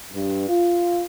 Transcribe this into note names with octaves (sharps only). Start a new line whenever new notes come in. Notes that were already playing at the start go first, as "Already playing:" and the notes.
G2
F4